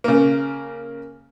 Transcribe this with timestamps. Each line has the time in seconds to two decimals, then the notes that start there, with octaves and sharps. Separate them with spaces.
0.04 C#3 A#3